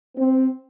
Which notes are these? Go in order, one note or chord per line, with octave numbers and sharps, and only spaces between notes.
C4